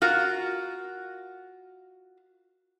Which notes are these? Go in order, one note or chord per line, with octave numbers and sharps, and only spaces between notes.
F4 F#4 A#4